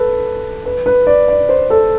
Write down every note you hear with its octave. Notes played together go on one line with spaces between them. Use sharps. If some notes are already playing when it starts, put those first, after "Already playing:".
Already playing: A4 B4
B4
B4
D5
D5
C5
A4